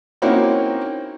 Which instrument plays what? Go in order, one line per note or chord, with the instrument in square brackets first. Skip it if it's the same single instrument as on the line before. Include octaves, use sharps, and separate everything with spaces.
[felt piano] A#3 C4 C#4 D#4 E4 F#4